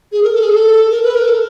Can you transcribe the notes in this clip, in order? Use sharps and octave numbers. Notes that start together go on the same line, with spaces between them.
G#4
A#4
A4
G#4
A4
A#4
B4
A#4
A4